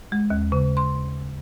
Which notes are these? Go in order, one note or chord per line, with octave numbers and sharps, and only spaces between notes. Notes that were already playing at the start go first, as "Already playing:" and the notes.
G#3
D#2
C#3
C6